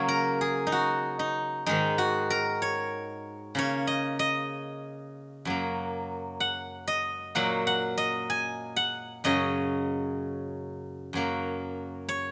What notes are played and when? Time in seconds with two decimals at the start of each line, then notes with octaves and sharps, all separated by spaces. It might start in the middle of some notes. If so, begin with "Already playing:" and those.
Already playing: C#3 F#3 A#3 C#5
0.08 A#4
0.41 G#4
0.67 D#4
0.72 F#4
1.19 D#4
1.66 G#2 D#3 G#3 D#4
1.98 F#4
2.30 A#4
2.62 C#5
3.55 C#3 A#3 C#5
3.87 D#5
4.19 D#5
5.45 F#2 F#3 A#3
6.40 F#5
6.87 D#5
7.35 A#2 F#3 A#3 F#5
7.67 F#5
7.98 D#5
8.30 G#5
8.76 F#5
9.24 F#2 C#3 F#3 D#5
11.13 F#2 F#3 A#3
12.09 C#5